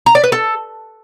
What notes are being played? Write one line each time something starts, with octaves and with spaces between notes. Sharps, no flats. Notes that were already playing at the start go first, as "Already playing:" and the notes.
A#5
D5
B4
A4